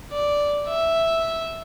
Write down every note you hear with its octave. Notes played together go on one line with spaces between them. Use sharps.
D5
E5